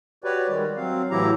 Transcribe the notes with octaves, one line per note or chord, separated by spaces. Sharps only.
F#4 G4 B4 C#5 D5
D#3 G3 G#3
F#3 C4 F5
A2 E3 F#3 E4 G4 A#5